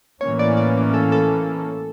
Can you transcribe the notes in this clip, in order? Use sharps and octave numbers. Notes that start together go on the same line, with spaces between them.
A2 E3 A#3 C#4 C#5
D5
D5
A4
A4